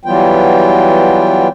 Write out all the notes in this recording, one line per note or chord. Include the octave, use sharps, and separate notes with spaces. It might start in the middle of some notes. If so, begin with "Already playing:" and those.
E3 F#3 G3 B3 F4 G5